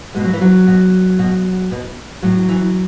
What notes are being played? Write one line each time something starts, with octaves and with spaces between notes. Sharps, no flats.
B2 G#3
F#3
E3
F#3
B2
B2
B2
A2 F#3
E3